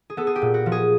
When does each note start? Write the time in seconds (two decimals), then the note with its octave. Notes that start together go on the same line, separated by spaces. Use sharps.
0.10 G#4
0.17 B3 A4
0.27 G#4
0.36 G4
0.42 A#2
0.54 F#4
0.66 F3
0.72 G#4